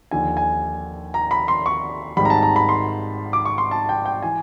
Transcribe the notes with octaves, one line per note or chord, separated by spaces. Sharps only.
D#2 D3 F3 G#5
G#5
A#5
B5
C6
C#6
G#1 G#2 D#3 G3 B5
A#5
A5
A#5
B5
C6
D6
C#6
C6
A5
G5
G5
E3 G#5